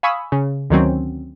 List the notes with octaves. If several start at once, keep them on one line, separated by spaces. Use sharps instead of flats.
F5 G#5 B5 C#6 D#6 E6
C#3
D2 D#3 F#3 C4 C#4